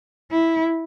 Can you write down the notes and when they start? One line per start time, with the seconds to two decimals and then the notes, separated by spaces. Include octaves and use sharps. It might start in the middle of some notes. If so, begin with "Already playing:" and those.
0.31 E4